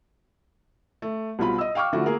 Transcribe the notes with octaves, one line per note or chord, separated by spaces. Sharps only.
A3
C2 B2 F4 B5
D#5 E6
F5 G5 C#6 D6 F6
D3 F3 A3 E4 F#4
A#3 G#4 A#4